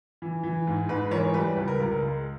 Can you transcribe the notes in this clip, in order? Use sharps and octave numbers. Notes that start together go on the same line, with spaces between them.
E3
E3
G#2
G#2 B4
E3 A#4 C#5
G3 B4
C#2 B4
A#4
C#2
A#4
G#3